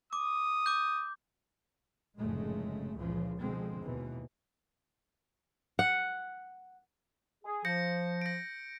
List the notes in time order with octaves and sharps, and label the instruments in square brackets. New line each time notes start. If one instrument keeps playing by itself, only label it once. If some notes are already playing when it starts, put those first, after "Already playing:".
[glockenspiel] D6 [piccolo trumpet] D#6
[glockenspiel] D6 G6
[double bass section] F1 F#2 A2 C#3 G#3 A3
C#2 F#2 A#2 C#3 E3 F3
B2 D3 F3 G#3 C4
D#2 B2 E3
[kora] F#5
[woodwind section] G#4
[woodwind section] F3 [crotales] G6 A#6 C#7
[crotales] A#6 D7